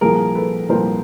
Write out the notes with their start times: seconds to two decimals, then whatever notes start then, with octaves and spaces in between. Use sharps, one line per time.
0.01 C2 A#2 F3 G#4 A#4
0.35 A4 B4
0.69 C2 A#2 F3 A#4 C5